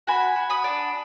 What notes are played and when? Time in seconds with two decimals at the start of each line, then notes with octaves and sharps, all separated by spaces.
0.07 F#4 G#5 B5
0.36 F#4
0.50 B5 D#6
0.64 D4